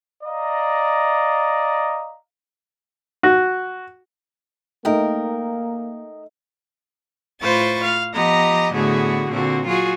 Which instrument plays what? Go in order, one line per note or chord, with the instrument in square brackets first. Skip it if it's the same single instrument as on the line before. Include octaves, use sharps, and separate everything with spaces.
[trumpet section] D5 D#5 F5 A#5
[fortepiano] F#4
[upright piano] A3 D#4 [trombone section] A#3 [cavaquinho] A#4 D#5 G5
[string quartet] A2 F4 B4 C5 C#6 A6
F5
F3 B3 G4 D#5 A#5
A2 D3 B3 F#4 G#4
A#2 D3 C4 F#4
F#3 F4 F#4 G#4